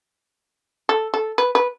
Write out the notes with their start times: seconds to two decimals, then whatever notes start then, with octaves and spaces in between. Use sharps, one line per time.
0.89 A4
1.14 A4
1.38 B4
1.55 B4